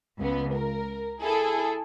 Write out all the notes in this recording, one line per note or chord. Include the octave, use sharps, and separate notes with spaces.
C#2 B3
A#4
E4 G#4 A4